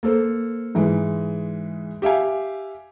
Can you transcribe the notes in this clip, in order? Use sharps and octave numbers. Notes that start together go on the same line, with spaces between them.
A#3 A4 C5
G#2 E3 G#3
G4 E5 F5 G#5